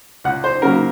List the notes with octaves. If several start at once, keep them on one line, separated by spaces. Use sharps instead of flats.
C#2 F#5
C5
C#3 F#3 A#3 A#4